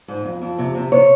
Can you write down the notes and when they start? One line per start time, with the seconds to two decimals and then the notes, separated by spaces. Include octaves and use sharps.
0.08 G#2
0.25 F2
0.42 F2
0.58 C3
0.75 C3
0.92 C3 C#5